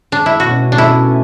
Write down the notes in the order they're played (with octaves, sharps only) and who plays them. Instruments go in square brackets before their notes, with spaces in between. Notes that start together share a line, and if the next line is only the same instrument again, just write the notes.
[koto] D4
E4
[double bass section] B2 A3 C#4 [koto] F#4
[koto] D4
E4